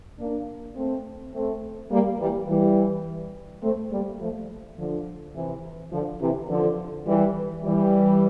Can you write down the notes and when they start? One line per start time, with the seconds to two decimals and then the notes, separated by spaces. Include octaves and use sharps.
0.19 A#3 D4
0.77 A3 C4
1.34 A3 C4
1.91 G3 A#3
2.20 E3 G3
2.48 E3 G3
3.63 A3 C4
3.91 G3 A#3
4.20 F3 A3
4.78 D3 F3
5.35 C3 E3
5.92 D3 F3
6.21 C3 E3
6.49 D3 F3
7.07 E3 G3
7.64 E3 G3